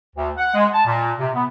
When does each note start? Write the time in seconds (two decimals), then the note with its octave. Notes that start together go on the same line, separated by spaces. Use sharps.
0.16 D2
0.36 F#5
0.54 G#3
0.73 A5
0.86 A#2
1.19 C3
1.34 B3